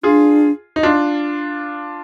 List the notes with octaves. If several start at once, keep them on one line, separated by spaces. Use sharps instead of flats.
D4 F4 G#4
D#4
D4 F4